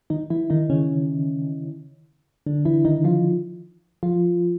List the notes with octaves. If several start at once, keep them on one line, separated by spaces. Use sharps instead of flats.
D#3 D#4
E3 E4
D#3 D#4
C#3 C#4
D3 D4
E3 E4
D#3 D#4
F3 F4
F3 F4